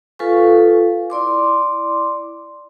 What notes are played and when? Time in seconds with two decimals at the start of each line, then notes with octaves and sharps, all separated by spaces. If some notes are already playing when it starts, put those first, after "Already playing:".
0.19 F4 A4 B4 F5 G#5 C#6
1.10 E4 D5 C6 D6